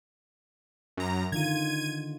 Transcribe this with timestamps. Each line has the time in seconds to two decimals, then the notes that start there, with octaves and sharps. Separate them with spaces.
0.97 F#2 A#5
1.32 D3 D#3 F4 G#6 D#7